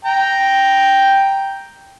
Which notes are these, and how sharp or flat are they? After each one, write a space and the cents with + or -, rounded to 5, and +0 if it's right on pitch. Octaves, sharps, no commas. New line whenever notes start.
G5 +0 A#5 +0